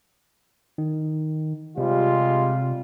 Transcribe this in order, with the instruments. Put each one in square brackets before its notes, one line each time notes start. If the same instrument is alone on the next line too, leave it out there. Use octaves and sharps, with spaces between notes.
[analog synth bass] D#3
[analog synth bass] C3 [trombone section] G3 G#3 F4